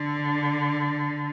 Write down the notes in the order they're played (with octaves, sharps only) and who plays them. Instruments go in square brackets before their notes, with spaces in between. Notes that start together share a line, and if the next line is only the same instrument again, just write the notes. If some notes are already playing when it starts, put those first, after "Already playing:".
Already playing: [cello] D3